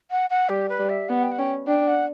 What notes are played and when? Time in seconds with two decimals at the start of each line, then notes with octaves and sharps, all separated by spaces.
0.11 F#5
0.30 F#5
0.49 G3 G4
0.69 B4
0.79 G3
0.89 E5
1.09 B3 F#5
1.23 G5
1.32 F#5
1.39 C#4 G5
1.67 D4 G5
1.87 F#5